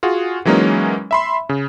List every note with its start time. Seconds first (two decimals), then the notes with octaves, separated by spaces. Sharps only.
0.03 F4 F#4 G#4 F#5
0.45 E3 F#3 G#3 A#3 C#4 D#4
1.11 E5 B5 C6
1.49 C#3